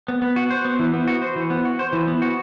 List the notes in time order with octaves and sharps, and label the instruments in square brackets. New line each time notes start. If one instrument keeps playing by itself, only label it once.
[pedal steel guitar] B3
B3
F#4
C5
B3
E3
B3
F#4
C5
E3
B3
F#4
C5
E3
B3
F#4